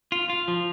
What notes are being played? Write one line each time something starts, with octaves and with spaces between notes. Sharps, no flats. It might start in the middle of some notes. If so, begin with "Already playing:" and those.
F4
F4
F3